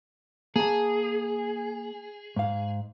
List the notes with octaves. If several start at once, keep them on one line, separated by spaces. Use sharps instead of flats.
A#3 G#4 A5
G#2 F5